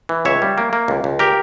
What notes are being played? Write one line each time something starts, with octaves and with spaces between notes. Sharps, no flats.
E3
C#2 C#5 E5
G3
A#3
A#3
C#2
C#2
G4 A#4